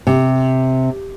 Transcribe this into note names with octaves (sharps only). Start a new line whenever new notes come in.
C3